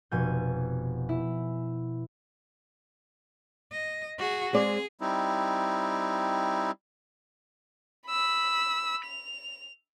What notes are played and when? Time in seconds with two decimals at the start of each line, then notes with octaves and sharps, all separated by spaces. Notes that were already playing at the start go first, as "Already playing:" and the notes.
0.12 F1 B2 G#5 G6
1.09 E4
3.72 D#5
4.18 F#4 G#4
4.53 G#3 C4 G#4 D5
5.01 G3 C4 D#4 E4
8.07 B5 E6
9.05 F7